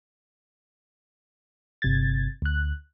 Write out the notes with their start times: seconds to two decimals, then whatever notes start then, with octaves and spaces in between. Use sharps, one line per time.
1.82 G1 C3 G#6 A6
2.42 D2 F#6